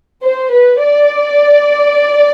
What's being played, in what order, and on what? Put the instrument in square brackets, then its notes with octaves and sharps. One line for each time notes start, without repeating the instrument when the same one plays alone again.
[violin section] C5
B4
D5